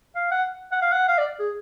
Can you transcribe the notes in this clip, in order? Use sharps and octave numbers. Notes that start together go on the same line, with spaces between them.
F5
F#5
F#5
F5
F#5
F5
D5
G#4